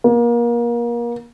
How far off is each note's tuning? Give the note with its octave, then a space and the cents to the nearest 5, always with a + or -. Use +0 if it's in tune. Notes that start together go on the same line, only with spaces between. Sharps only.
A#3 +30